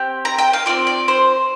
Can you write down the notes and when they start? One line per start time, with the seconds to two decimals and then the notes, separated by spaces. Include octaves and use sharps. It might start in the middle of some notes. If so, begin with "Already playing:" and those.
Already playing: C4 G4
0.25 A#5
0.38 G5
0.53 F5
0.66 C4 F4 D5
0.87 D5
1.08 C5